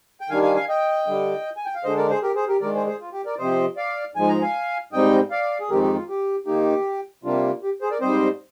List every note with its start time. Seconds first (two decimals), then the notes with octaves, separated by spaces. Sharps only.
0.21 G5
0.29 D#3 G3 D4 F5 G#5
0.42 F5 G#5
0.55 F5 G#5
0.69 D#5 G5
1.07 D3 G3 D4
1.57 G#5
1.65 G5
1.75 F5
1.84 D3 G#3 D4 C5 D#5
1.97 A#4 D5
2.10 G#4 C5
2.23 G4 A#4
2.35 G#4 C5
2.48 G4 A#4
2.61 D#3 G#3 D4 A#4 D5
2.75 G#4 C5
2.87 G#4 C5
3.00 F4
3.12 G4
3.26 A#4 D5
3.38 C3 F3 C4 C5 D#5
3.77 D5 F5
4.15 G#2 F3 G#3 G#5
4.29 A#5
4.42 F5 G#5
4.92 G#2 G3 C4 D#4 D#5 G5
5.31 D5 F5
5.60 G#4
5.70 F2 D#3 G#3 C4 D#4 G4 A#4
5.82 G4
5.95 F4
6.09 G4
6.46 D#3 A#3 D#4 G4
7.24 C3 G3 A#3 D4 F4
7.63 G4
7.81 G#4 C5
7.91 A#4 D5
8.01 G#2 G3 C4 C5 D#5